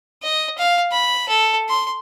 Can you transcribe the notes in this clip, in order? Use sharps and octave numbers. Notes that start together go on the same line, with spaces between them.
D#5
F5
B5
A4
C6